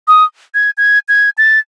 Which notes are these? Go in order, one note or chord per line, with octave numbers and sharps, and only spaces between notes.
D#6
G#6
G#6
G#6
A6